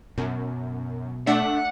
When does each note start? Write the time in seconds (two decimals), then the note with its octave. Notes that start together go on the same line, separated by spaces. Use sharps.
0.18 F#2 B2
1.27 A3 D4 E5 F#5